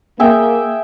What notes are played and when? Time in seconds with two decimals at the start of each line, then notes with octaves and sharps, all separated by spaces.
0.19 A#3 G#4 E5 G5